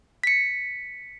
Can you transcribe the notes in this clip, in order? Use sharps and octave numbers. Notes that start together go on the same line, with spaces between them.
B6 C#7